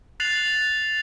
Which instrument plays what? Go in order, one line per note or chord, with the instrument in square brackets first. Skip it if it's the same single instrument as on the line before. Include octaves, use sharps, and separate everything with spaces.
[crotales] F#6 A6 C7 F7 F#7